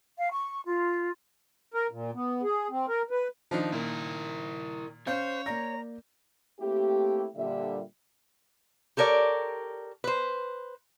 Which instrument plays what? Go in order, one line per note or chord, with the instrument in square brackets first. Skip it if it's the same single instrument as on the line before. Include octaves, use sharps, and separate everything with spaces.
[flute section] F5
C#6
F4
[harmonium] A#4
A#2
B3
G#4
C4
A#4
B4
[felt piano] D#3 [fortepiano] F3 D4 D#4
[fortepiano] A#2 [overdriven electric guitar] E4 A#4
[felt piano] C#4 F5 G6 [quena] C5 [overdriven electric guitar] C#5
[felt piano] A#3 D5 A#6 [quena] A#5
[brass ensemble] A3 A#3 C4 E4 G4
A#2 D3 G3 E5
[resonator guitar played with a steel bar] G4 A4 A#4 C#5 D5
B4 C5